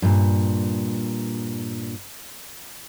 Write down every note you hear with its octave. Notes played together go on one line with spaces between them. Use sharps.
G2 A#2